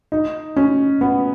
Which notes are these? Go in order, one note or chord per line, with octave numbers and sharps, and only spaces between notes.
D#4
C#4
B3